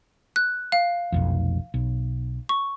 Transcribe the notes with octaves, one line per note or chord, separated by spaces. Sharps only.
F#6
F5
F1 B1 F2
B1
C#6